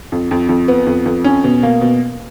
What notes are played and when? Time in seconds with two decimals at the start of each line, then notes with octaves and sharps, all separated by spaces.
0.12 F2
0.31 F2
0.49 F2
0.68 B3
0.87 F2
1.06 F2
1.24 C#4
1.44 B2
1.63 A#3
1.81 B2